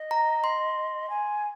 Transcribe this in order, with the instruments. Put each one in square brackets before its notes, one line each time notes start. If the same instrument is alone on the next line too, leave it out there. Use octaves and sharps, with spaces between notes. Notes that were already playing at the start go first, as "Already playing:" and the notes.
Already playing: [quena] D#5
[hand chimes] A#5
C6
[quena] G#5